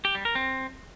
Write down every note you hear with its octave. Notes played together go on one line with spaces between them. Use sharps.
G4
G3
A#4
C4